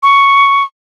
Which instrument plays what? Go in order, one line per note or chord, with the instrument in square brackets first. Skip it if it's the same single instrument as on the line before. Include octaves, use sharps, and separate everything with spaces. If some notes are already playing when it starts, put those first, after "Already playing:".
[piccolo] C#6